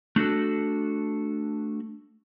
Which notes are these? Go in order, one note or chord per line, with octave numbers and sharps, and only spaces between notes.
A3 D4 F#4 A4